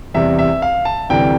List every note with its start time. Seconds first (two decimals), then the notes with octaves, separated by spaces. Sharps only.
0.14 E2 C3 G3 E5
0.39 E5
0.62 F5
0.85 A5
1.10 D2 C3 E3 G3 G5